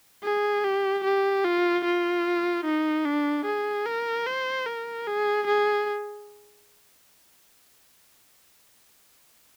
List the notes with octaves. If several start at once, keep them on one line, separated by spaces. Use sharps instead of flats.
G#4
G4
G4
F4
F4
D#4
D4
G#4
A#4
C5
A#4
G#4
G#4